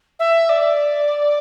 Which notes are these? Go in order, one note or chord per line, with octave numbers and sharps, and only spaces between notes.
E5
D5